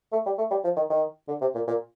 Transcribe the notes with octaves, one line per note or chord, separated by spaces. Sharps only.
A3
G3
A3
G3
F3
D#3
D#3
D3
C3
A#2
A#2